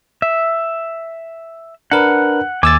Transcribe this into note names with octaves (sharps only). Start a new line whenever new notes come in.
E5
D4 A#4 B4 F#5
D#2 G#5 D6 E6 A6